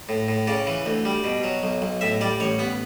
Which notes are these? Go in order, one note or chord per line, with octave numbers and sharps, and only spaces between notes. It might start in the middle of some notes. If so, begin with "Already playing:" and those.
A2
A2
C#3 D5
E3
D2
G3
B2
F#3
B1
B1
A2 E5
G3 D5
A1 C#5
B3